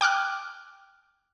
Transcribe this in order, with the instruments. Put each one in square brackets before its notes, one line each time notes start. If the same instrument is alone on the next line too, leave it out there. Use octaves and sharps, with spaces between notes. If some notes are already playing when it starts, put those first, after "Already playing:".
[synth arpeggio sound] G5 D6 F6 F#6